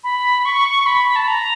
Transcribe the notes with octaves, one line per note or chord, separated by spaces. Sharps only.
B5
C#6
B5
A5
A#5